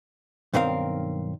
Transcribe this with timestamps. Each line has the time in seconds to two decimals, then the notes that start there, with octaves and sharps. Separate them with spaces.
0.53 B1 G2 D#3 C4 A#4 F5